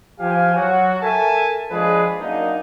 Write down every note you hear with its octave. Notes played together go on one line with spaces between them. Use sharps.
F3 G4 F5 G#5
F#3 F#4
A4 A#4 E5 G#5 A5
F3 G#3 D4 G#4 B4
F#2 A#3 D4 D#4